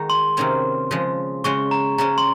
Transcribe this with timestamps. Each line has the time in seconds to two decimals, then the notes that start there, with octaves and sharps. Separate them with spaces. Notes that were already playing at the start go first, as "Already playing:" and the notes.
Already playing: D#3 G#3 D#4 F#4
0.10 C6
0.37 C3 D#3 A#3 C#4
0.91 C#3 F3 G#3
1.44 C#3 G#3 C#4 F#4 C#6
1.71 A#5
1.98 C#3 G#3 C#4 A#5
2.18 C6